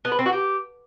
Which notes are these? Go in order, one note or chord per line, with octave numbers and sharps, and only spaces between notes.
B3
B4
C4
F#4
G4